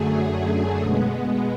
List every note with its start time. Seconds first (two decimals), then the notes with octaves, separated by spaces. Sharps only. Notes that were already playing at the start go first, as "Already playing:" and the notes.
Already playing: F#2 D3 F#3 A3 G#4
0.81 B2 G#3 B3